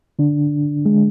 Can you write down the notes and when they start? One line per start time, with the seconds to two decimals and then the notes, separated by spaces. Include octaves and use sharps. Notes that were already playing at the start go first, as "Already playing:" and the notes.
0.19 D3 D4
0.86 G#3